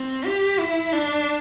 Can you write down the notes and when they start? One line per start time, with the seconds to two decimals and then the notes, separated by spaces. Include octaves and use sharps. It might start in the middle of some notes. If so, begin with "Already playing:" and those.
Already playing: C4
0.25 G4
0.59 E4
0.93 D4